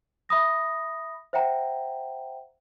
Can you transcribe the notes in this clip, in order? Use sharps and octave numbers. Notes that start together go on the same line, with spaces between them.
E5 B5 D#6 A#6
C5 E5 F#5 G5 A#5